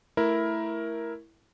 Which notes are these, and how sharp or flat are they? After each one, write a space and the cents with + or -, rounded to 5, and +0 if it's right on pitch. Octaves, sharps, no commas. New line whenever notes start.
A3 +0 E4 +0 A#4 +10